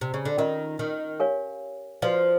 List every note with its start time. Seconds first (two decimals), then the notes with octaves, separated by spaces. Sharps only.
0.01 C3
0.14 C#3
0.25 D3
0.37 D#3 C#4 F4 A#4 D#5
0.79 D#3
1.20 G4 A#4 C#5 F5 G#5
2.02 F3 F#4 B4 D5 F5